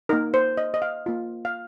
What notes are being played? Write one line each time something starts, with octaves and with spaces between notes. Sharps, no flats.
A#3 D#4 A#4
C5
D#5
D#5
F5
A#3 F4
F5